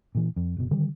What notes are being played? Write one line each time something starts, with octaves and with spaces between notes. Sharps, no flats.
A#2 E3
F2
F#1 B2
D3 D#3 G3